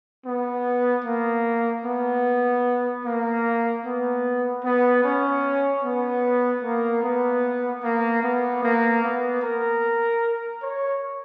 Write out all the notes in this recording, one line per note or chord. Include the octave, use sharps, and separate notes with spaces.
B3
A#3
B3
A#3
B3
B3
C#4
B3
A#3
B3
A#3
B3
A#3
B3
A#4
C#5